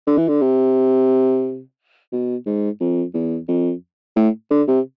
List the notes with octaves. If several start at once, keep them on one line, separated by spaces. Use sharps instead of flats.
D3
E3
D3
C3
B2
G#2
F2
E2
F2
A2
D3
C3